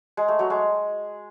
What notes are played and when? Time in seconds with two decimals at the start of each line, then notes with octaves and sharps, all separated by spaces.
0.17 G#3
0.28 A3
0.39 F#3
0.50 G#3